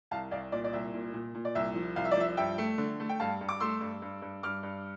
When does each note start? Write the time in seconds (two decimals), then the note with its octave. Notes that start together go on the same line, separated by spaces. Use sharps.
0.11 C2 F5 A5
0.31 C2 D5 F5
0.52 A#2 D5
0.64 D5
0.73 C2 E5
0.94 A#2
1.14 A#2
1.34 A#2
1.45 D5
1.55 C2 E5
1.75 F3
1.96 C2 F5
2.05 E5
2.11 D5
2.17 F3 E5
2.37 G2 E5 G5
2.58 A3
2.78 D3
3.00 A3
3.09 G5
3.20 G2 F5 A5
3.41 G2
3.49 D6
3.60 A3 C6 E6
3.81 G2
4.02 G2
4.22 G2
4.43 G2 D6 F6
4.63 G2